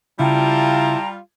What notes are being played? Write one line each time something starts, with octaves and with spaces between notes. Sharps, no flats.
C#3 G3 E4 F4 G5 A5 A#5